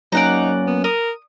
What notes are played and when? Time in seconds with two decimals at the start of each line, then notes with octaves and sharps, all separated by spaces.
0.12 F#3 A#3 C#4 D#4 D5 F#5 A#5
0.67 B3
0.84 A#4 D#6